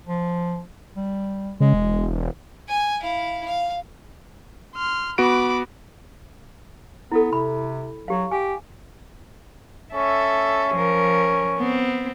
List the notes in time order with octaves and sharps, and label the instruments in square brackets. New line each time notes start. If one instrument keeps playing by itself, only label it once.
[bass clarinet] F3
G3
[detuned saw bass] C#3 [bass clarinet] G#3
[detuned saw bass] E1
[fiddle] G#5
E4 F5
F5
[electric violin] C6 F6
[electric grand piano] B3 F#4 D7 [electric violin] B5 D6
[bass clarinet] B3 [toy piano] E4 A4
[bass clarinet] C3 [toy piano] B5
[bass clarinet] F#3 [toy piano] G4 F5
[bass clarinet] G4 [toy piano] G#5
[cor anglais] C#4 [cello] A4 E5
[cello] F3 A#4
B3 C4